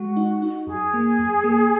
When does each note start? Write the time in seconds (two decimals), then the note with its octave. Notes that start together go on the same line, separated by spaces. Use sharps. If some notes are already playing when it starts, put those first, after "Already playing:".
Already playing: G#3 F#4
0.17 D#4
0.42 D#4
0.67 F#2 G#4
0.94 A#3
1.19 F#2
1.44 A#3